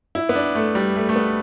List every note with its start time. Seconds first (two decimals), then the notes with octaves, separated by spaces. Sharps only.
0.15 E4
0.29 B3
0.35 D4
0.55 A3
0.75 G3
0.95 A3
1.09 A3
1.15 B3